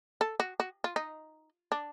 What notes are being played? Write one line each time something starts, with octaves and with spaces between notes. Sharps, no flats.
A4
F#4
F#4
F4
D#4
D4